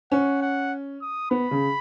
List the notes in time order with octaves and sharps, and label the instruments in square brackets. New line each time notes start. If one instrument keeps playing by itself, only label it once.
[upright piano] C#4 [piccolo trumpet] F#5
[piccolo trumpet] F#5
D#6
[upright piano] B3 [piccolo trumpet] B5
[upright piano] C#3